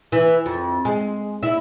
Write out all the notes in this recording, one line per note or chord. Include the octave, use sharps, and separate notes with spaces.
E3
F2
G#3
E4